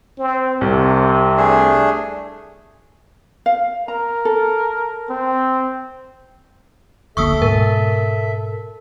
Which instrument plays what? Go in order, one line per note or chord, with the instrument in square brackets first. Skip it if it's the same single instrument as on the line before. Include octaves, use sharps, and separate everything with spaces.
[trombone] C4
[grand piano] C2 [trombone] C3
[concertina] A3 D4 G#4
[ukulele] F5
[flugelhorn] A#4 [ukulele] A#5
[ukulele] A4
[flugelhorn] C4
[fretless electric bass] F1 D2 A#3 [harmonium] A4 E5 [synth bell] C#6 D#6 E6
[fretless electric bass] G#2 B2 [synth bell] A#4